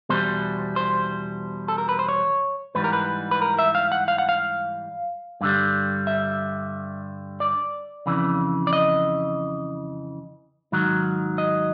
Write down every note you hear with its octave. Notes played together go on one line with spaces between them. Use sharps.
E2 B2 G3 C5
C5
A4
A#4
B4
C5
C#5
G#2 E3 G3 B4
A#4
B4
B4
A#4
E5
F5
F#5
F5
F#5
F5
G2 D3 G3
E5
D5
F2 C#3 E3
D5
D#5
G#2 D#3 F#3
D#5